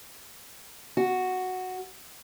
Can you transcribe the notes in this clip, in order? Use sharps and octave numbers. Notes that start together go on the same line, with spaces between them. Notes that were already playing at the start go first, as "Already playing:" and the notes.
F#4